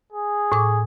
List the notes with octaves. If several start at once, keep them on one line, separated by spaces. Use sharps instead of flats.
G#4
A2 C#6 D6